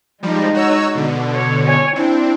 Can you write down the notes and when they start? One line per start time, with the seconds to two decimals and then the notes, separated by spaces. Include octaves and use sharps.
0.23 F3 G3 G#3 D#4
0.54 F#4 C#5 E6
0.95 B2 D3
1.34 C#5
1.66 C#5 G#5
1.96 C4 D4 E4